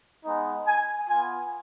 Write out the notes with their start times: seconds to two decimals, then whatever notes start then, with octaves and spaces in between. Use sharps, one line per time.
0.25 G#3 B3 D#4
0.67 G#5
1.09 B3 F4 G#5